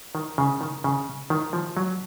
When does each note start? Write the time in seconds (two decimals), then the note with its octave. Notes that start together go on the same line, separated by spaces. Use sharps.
0.15 D#3
0.38 C#3
0.61 D#3
0.84 C#3
1.30 D#3
1.53 F3
1.77 F#3